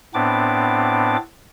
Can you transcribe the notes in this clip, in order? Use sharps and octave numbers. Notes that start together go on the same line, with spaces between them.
A2 B3 C4 D4 D6